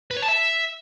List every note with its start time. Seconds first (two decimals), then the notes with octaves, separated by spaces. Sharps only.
0.11 B4
0.17 C#5
0.22 A5
0.28 E5